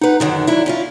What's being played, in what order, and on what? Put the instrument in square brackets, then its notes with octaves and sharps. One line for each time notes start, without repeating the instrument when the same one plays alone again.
[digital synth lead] D#4 [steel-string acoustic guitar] B4 F#5
[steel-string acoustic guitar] F#2 D3 D#3
F#3 D4 E4
C#4 E4 F4